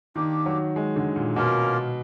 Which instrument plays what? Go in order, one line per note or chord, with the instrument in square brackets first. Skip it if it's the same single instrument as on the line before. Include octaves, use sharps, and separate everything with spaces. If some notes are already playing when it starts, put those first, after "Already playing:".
[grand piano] D#3 [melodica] A#3 D4 G4
[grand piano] F#3
G#3
D3
A#2
[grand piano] B2 [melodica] A#3 C#4 F4 A#4